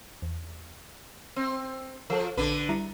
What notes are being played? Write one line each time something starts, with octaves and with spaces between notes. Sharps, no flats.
E2
C4
F3 A4 A#4
A#1 D3 D4 A4 B4
G3 E4 A#5